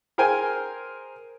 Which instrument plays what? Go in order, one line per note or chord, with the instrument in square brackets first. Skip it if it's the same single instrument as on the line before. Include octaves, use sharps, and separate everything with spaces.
[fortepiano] G#4 A#4 C5 G5 G#5